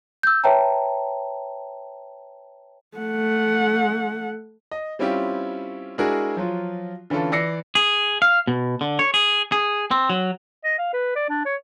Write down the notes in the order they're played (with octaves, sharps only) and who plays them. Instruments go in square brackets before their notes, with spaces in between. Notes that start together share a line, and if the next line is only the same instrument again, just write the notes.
[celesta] E6 G6
B4 C#5 E5 G5 A5 A#5
[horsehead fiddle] A3 F#5
[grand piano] D#5
G3 C4 C#4 E4 F4 G4
G#3 D4 E4 F#4 G#4 A#4
F3 F#3 F4
D3 E3 C#4 F4 A4
E3 D5 E6 A#6 C7 C#7
[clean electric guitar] G#4
F5
B2
D3
C#5
G#4
G#4
C4
F#3
[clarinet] D#5
F5
B4
D5
D4
C#5